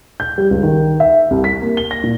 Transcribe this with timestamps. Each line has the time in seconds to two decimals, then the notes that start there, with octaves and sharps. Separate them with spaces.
0.20 G6
0.38 G3
0.51 C#2
0.63 D#3
1.00 E5
1.31 C2
1.44 B6
1.62 A#3
1.77 G7
1.91 A#6
2.04 A#2